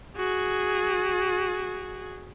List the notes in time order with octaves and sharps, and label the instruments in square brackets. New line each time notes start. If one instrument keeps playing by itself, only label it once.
[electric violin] F#4 G#4